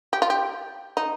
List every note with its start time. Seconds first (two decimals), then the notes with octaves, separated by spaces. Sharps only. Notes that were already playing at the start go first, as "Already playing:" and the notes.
0.13 G4
0.22 F4
0.30 G4
0.97 D#4